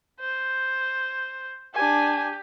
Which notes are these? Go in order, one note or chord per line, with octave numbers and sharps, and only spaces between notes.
C5
D4 G4 G#5